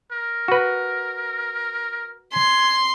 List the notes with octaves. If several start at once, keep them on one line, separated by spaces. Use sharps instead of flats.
A#4
F#4 B4
G#5 C6